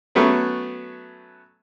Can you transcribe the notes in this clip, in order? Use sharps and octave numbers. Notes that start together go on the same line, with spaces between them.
F#3 A3 B3 C#4